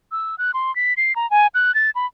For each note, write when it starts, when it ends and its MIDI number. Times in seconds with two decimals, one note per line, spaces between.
0.12 0.35 88
0.38 0.51 90
0.54 0.74 84
0.76 0.94 95
0.97 1.15 96
1.16 1.29 82
1.31 1.47 80
1.54 1.74 90
1.75 1.90 93
1.95 2.06 83